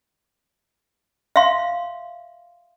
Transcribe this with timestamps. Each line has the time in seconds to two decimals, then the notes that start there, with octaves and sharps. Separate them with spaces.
1.36 E5 F5 C6